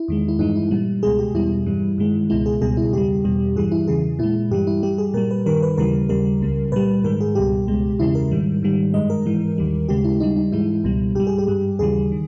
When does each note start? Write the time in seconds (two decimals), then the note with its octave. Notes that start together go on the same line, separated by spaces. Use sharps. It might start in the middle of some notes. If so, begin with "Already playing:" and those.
Already playing: E4
0.08 E2 D#3 G#3
0.28 E4
0.39 G2 E3 G#3 D#4
0.56 E4
0.71 A#2 G3
1.03 C#2 B2 G#3 G#4
1.19 G4
1.34 E2 B2 G3 E4
1.66 G2 E3 G3
1.98 G2 D#3 G#3
2.30 C#2 B2 G#3 E4
2.46 G#4
2.62 C#2 B2 G3 G#4
2.77 E4
2.93 E2 C#3 G3 G4
3.24 E2 B2 G3
3.56 G2 E3 G3 G#4
3.72 E4
3.88 E2 C#3 E3 G#4
4.19 A#2 G#3 E4
4.51 G2 E3 G3 G4
4.67 E4
4.83 G2 G3 G4
4.98 G#4
5.14 A#2 G3 A#4
5.31 B4
5.46 G2 D#3 G3 A#4
5.62 B4
5.78 D#2 C#3 E3 G3 A#4
6.09 D#2 C#3 G3 A#4
6.41 C#2 C#3 G3
6.72 A#2 G3 B4
7.04 G#2 D#3 G#3 A#4
7.21 G#4
7.35 C#2 B2 G3 G4
7.67 C#2 B2 G#3
7.99 E2 C#3 G#3 E4
8.15 A#4
8.32 G#2 D#3 G3
8.63 G#2 D#3 G3
8.94 G2 D#3 G#3 D#5
9.10 A#4
9.26 G#2 E3 G#3
9.58 D#2 D#3 G3
9.89 D#2 C#3 G#3 G4
10.04 E4
10.20 D#2 C#3 G3 D#4
10.36 D#4
10.52 G#2 E3 G#3 E4
10.84 C#2 B2 G3
11.15 G#2 G3 G4
11.27 G#4
11.38 G4
11.48 G2 G3
11.79 D#2 C#3 E3 G3 G#4
12.12 D#3